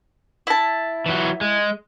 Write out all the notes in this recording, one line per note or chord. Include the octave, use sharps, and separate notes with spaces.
E4 A5
E3 F#3
G#3